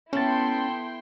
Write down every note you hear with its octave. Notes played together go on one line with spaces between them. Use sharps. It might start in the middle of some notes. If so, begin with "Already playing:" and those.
B3 C#4 E4 A4 G5 C6 A6